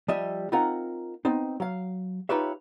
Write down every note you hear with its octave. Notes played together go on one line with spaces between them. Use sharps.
F3 G3 D#5 E5
C4 D#4 F4 A#4 F#5 A#5
B3 C4 D#4
F#3 F5
D#4 F4 G4 B4 C#5 E5